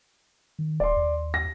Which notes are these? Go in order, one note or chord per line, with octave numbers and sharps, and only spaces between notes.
D#3
D#1 D5 C6
D#2
A#6